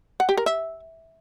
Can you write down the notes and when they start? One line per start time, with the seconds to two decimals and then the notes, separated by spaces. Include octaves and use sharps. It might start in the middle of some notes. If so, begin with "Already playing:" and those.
0.20 F#5
0.29 G4
0.37 A#4
0.46 E5